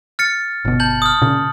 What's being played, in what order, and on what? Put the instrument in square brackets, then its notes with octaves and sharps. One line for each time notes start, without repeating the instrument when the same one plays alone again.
[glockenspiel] F6 A6 C#7
[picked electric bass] G1 B2
[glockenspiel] A5 G6 F#7
D#6 F6
[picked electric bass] A#2 C#3